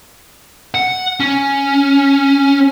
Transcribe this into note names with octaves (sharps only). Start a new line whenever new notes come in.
F#5
C#4